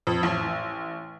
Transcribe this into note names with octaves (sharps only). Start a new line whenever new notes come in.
F2
A1